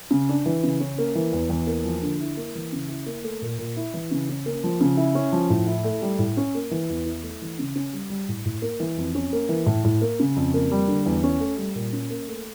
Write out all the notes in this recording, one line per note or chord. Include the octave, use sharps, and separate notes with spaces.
C#3
D4
E3
C#3
C#4
A#3
E3
E2
E2
A#3
F3
D3
E4
A#3
E3
C#3
E4
A#3
A3
A#2
A#2
E4
E3
C#3
C#4
A#3
F3
C#3
E4
C#4
F3
A2
E4
A3
G3
A2
C#4
A#3
E3
E2
E4
A3
E3
C#3
C#4
G3
G3
A2
A2
A#3
E3
F2
C#4
A#3
E3
A2
A2
A#3
C#3
F2
A#3
G3
D3
E2
C#4
A3
G3
A#2
C#4
A#3
A3